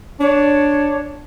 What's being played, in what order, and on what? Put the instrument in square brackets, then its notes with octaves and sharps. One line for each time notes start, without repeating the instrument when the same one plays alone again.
[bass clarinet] D4 [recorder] C#5